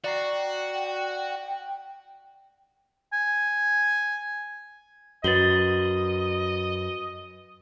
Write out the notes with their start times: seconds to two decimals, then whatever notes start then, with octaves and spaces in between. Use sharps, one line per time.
0.04 F#4 D5 G5 A#5 C7
3.13 G#5
5.24 F#2 F#4 B4 D#5 A6 F#7 G7